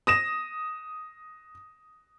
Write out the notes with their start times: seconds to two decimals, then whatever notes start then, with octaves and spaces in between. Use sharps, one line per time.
0.07 D#6 A#6 E7